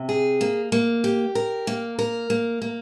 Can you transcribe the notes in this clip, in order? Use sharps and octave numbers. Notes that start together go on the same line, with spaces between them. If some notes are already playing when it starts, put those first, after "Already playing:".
Already playing: C3
G#4
A#3
A#3
G4
A#4
A#3
A#4
A#3
A#3